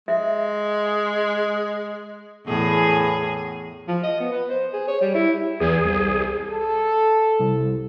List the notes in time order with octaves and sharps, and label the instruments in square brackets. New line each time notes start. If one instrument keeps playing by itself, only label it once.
[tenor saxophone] G#3 [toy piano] E5
[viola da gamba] E2 A2 G#4
[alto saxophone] F3
D#5
B3
B4
C5
G#4
C#5
G3
E4
[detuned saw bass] E2 [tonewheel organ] G#4
[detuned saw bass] C2
[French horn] A4
[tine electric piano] C2